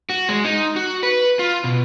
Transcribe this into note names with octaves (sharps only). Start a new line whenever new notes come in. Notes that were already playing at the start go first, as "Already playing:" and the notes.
F#4
G#3
D#4
F#4
B4
F4
B2